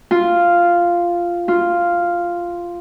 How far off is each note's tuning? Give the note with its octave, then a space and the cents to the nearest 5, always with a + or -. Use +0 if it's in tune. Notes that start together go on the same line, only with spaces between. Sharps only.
F4 -5
F4 -5